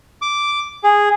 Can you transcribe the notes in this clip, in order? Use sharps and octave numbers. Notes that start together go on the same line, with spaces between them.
D6
G#4